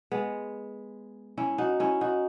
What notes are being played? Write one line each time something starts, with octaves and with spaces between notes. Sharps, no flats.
G#3 B3
C#4 E4
D#4 F#4
C#4 E4
D#4 F#4